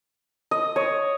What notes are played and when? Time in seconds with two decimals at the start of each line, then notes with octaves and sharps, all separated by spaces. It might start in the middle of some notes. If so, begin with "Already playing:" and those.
0.51 D#5
0.76 C#5